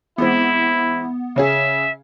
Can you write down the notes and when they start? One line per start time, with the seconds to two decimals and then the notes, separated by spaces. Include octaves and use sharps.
0.18 E3 G#3 B3 C4 E4
1.36 C#3 C#4 G#4 E5